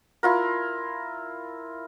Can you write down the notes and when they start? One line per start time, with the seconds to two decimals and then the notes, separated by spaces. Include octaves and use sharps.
0.23 E4 F4 A#4